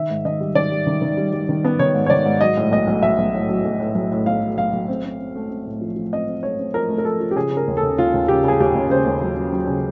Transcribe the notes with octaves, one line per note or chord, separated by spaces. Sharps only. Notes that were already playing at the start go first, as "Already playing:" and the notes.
Already playing: D#3 E5
G#2
D#3 D#5
G3
D#3 D5
G3
D#3
D#3
G3
G3
D#3
B3
D#3 C#5
G#2
C#5
D#3 D5
G#2
F#3 D#5
A2
B1 D#5
B1
B1 E5
B1
A2
F#3
B1
A2
B1
A2
B1 F5
F#3
B1 F5
B1
C4
C4
C4
A3
C4
A2
F3
F3
C4 D#5
C4
A3 C#5
C4
F3 A#4
A3
A#4
F3 A4
F3
G4
C#3 G#4
C#3
A#4
D#2
A4
D#2
D#2 F4
D#2
C#3 G4
C#3 G#4
D#2 G4
D#2
C#3 C5
D#2
F#3
F#3
F#3
C#3